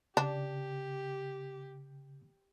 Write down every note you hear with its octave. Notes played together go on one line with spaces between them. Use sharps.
C#3 D4 G4